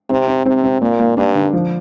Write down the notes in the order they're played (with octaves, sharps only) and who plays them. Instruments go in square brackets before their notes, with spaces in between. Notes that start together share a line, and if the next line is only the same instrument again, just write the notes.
[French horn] C3 [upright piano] C4
[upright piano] C4
[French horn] C3 [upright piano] C4
[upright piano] C4
[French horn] A#2 [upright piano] A#3
[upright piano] A#3
[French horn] G2 [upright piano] D4
[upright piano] D3
F3